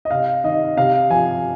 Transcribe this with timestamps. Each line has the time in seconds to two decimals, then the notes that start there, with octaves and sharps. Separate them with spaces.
0.05 D#5
0.11 C3 F5
0.44 D#3 D#5
0.77 C3 F5
1.10 F3 G#5